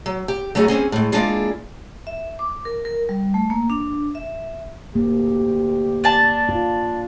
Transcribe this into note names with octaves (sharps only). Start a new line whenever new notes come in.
F#3
G4
F#3 A3 B3 D#4 G#4
G3 C4 C#4 G#4
A2 G#3
G#3 A#3 D4 E4 F4 G#4
E5
D6
A#4
A#4
G3
A3
A#3
D4
E5
D2 A#3 G4
D4 A5
F4